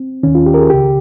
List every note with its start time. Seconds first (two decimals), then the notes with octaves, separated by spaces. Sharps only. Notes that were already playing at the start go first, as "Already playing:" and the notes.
Already playing: C4
0.23 D#2 D#3 C#4
0.35 F4
0.46 G4
0.54 A#4
0.59 G#4
0.70 C#2 C#3 G4